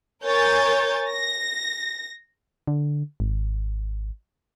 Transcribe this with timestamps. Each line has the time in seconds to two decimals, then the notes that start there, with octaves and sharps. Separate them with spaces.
0.24 A#4 C#5 G#5 G6 A6
1.09 A#6
2.68 D3
3.20 G#1